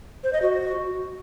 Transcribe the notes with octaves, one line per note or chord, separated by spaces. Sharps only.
C5
D#5
F#4